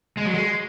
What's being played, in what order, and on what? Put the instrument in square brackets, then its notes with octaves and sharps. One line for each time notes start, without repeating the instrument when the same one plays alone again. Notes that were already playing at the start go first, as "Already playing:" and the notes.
[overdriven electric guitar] G#3
F#3
G#3